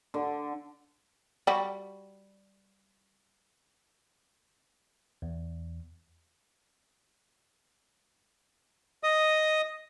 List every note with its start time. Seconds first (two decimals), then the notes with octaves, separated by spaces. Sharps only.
0.14 D3
1.47 G3 F#4
5.22 E2
9.03 D#5 D#6